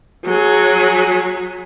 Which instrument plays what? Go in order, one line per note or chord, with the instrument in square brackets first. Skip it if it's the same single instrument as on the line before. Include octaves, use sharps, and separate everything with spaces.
[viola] F#3 G#4